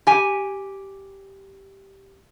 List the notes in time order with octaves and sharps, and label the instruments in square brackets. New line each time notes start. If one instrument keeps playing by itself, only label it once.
[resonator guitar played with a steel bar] G4 G#5